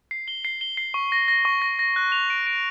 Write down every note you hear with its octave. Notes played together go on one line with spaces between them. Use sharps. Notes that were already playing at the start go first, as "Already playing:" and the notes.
C7
G7
C7
G7
C7
C#6
A#6
A#6
C#6
A#6
A#6
F#6
F7
D7
D7